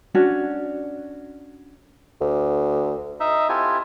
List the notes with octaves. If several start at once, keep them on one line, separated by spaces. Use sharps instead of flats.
C#4 D4 F#4
D2
D#4 D#5 E5
C4 E4 F4 G4 A4 G#5